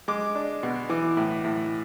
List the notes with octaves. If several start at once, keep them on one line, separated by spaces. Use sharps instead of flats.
G#3 D6
D4
B2
E3 D6
A2
A2